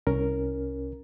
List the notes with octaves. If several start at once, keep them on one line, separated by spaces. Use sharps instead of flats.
C2 C#4 A#4